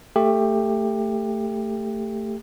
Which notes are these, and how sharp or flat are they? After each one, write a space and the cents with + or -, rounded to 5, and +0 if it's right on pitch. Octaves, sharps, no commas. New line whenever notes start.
A3 +15 G4 +20